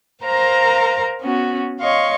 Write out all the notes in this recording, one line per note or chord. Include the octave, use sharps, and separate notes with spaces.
A#4 C5 F5 A#5
B3 C#4 F#4
C#5 D#5 F5 C6 C#6